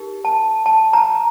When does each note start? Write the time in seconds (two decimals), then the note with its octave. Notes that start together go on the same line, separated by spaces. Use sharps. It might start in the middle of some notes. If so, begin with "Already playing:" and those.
Already playing: D#4 G4 A#4
0.25 A5
0.66 A5
0.93 A#5